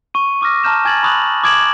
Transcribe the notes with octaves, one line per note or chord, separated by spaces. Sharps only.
C#6 D#7
C#6 D6 E6 F6 A#6
A5 A#5 F6 G6 E7
G#5 G#6 A6 F#7
B5 C#6 D#6 F#6 F7 F#7
D6 D#6 G#6 D7 E7 F#7